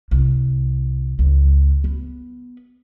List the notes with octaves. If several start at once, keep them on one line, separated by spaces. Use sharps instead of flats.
C2
C#2
B3